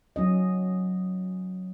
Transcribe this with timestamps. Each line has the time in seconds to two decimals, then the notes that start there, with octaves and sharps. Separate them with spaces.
0.16 F#3 C#4 D#5